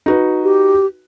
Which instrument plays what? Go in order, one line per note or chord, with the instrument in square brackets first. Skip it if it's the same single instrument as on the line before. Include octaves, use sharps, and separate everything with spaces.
[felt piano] D#4 F#4 B4
[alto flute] G4